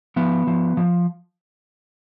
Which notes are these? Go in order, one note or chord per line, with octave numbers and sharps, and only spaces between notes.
F3 B3
F3
F3